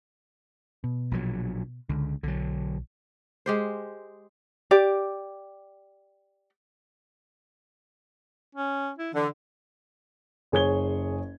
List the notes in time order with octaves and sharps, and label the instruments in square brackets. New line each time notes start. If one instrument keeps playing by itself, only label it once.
[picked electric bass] B2
[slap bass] A#1 A#2 F#3
[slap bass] C#2 [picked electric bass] D3
[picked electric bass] B1 [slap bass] D3 F#3
[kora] G#3 G4 C5
[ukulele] G4 D5
[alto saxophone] C#4
E4
[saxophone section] D3 [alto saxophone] E3
[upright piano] F#1 G#4 C#5 G#6 G7